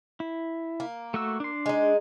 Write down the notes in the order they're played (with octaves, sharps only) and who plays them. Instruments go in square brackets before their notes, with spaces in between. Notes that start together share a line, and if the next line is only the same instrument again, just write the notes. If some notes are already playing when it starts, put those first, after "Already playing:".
[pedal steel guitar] E4
[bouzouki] A#3
[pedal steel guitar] A3 F#4 E6
D4 C6
[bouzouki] G#3 D#4